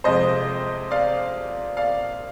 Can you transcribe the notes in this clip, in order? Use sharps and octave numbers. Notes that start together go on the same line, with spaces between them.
F2 C3 F3 G#3 C5 D#5
D5 F5
D5 F5